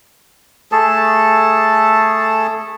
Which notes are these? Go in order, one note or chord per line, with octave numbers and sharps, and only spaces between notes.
A3 G#4 A4 A5